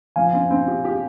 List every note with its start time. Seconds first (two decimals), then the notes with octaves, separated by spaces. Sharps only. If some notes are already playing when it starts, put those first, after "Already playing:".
0.16 F3 F5 G#5
0.33 C4
0.51 C4
0.68 G4
0.84 G4